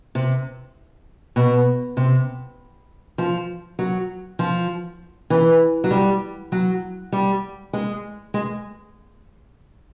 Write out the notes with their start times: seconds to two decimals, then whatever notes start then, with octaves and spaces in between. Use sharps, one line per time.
0.15 C3
1.36 B2
1.97 C3
3.18 F3
3.79 F#3
4.39 F3
5.30 E3
5.84 F#3
5.91 G3
6.52 F#3
7.12 G3
7.73 G#3
8.34 G#3